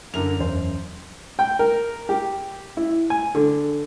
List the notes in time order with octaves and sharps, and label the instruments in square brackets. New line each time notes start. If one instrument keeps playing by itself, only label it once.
[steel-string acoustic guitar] F#2 [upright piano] D3 A#4 F7
[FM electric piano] E2 [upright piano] C5
[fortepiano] G5
A#4
G4
E4
G#5
D3